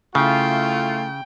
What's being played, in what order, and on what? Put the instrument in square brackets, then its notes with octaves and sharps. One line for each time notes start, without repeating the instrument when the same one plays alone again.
[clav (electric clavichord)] C#3 [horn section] A3 E4 F4 [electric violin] G5